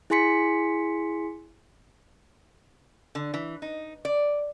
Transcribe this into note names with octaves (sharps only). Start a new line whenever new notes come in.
E4 G#4 G#5 C6 B6 C#7
D3
E3
D#4
D5